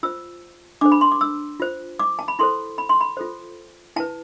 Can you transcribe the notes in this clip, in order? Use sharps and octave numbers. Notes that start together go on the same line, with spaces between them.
F4 C5 E6
D4 A4 C5 D6
B5
C6
D6
E6
F4 C5
D6
A5
B5
E4 A4 C5 C6
B5
C6
B5
F4 A4 C5
E4 B4 A5